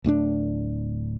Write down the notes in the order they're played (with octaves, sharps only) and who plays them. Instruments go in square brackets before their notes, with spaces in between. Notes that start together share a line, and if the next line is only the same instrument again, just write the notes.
[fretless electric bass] D1 A2 C#4 D4